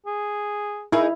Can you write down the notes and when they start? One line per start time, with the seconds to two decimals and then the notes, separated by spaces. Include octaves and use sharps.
0.06 G#4
0.92 D#4 E4 G#4 A#4